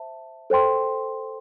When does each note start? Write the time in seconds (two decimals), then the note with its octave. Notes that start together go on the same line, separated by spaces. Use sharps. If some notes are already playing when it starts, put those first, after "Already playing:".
Already playing: C5 E5 A5
0.50 A4 C5 G5 C6